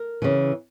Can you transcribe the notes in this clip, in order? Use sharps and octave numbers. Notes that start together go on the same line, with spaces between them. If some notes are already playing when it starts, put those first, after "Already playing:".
Already playing: A#4
C#3 E3